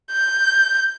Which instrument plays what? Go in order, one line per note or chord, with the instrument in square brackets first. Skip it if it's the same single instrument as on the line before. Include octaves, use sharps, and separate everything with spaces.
[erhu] G6